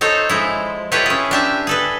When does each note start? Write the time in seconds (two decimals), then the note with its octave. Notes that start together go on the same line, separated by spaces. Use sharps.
0.01 D#4 A4 C5 C#5
0.29 F3 G#3 E4
0.92 E4 F4 G4 A4 B4 C#5
1.06 C#4 G#4
1.31 D4 G4 E5
1.67 G#4 A4 B4